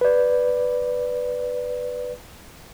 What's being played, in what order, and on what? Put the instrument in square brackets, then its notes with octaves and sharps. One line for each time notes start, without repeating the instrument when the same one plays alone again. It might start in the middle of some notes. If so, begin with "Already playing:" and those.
[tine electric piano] B4 D5